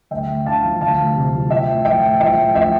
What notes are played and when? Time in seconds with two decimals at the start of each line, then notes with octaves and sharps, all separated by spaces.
0.11 D2 E5 G5
0.28 D2
0.45 D3 F5 A5
0.63 F3
0.81 D2 F5 A5
0.98 D2
1.16 C3
1.34 F3
1.50 F3 E5 G5
1.68 A2
1.85 F3 E5 G5
2.02 A2
2.20 F3 E5 G5
2.38 A2
2.55 F3 E5 G5